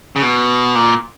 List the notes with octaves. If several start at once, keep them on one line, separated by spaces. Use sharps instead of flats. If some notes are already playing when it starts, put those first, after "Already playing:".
C#3
B2
A#2